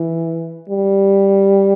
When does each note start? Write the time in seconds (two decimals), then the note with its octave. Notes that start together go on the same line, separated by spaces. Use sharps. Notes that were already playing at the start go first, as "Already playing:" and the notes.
Already playing: E3
0.69 G3